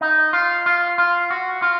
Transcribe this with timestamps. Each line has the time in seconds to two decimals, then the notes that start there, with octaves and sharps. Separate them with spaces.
0.01 D#4
0.33 F4
0.66 F4
0.98 F4
1.31 F#4
1.62 F4